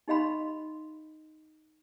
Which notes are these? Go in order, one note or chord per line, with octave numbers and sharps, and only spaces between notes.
D#4 G4 D#5 F5 B5 C6